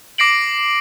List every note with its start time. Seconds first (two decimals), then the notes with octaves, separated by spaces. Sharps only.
0.18 D6 A#6 C7 D7 F#7